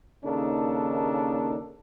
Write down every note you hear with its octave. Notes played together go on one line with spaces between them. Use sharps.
D#2 C#3 A#3 D4 D#4 A4